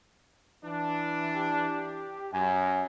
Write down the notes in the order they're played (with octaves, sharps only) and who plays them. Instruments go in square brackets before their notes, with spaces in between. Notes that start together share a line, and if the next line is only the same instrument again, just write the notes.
[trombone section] E3 D4
[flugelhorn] G4
[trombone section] F#2 [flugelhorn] G#5